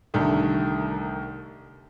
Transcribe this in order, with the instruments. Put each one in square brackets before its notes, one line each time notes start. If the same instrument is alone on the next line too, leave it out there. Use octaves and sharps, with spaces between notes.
[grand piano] C2 D3 D#3 A3